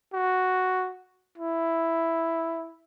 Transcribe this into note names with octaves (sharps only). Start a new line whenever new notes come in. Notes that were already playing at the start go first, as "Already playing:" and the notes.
F#4
E4